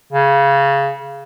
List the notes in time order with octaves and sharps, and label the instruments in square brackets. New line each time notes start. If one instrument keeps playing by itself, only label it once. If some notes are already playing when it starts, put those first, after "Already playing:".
[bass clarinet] C#3